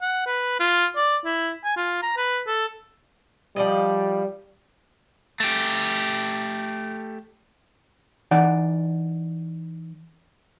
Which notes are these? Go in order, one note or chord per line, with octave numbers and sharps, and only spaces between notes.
F#5
B4
F4
D5
E4
G#5
F4
A#5
B4
A4
F3 G3 D5 D#5
A3 G4
E3 D#4 D5 F#5